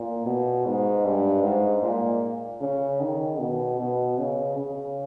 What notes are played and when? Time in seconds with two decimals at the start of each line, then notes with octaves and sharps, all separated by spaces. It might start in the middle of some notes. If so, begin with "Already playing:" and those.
Already playing: A#2
0.25 B2
0.66 G#2
1.05 G2
1.43 G#2
1.82 A#2
2.61 C#3
3.01 D#3
3.39 B2
3.79 B2
4.18 C#3
4.57 C#3